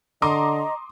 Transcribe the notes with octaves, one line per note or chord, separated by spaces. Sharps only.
D3 D#5 A#5 C6 D6 D#6